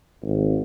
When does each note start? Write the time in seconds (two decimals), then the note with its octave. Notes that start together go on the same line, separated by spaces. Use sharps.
0.22 G#1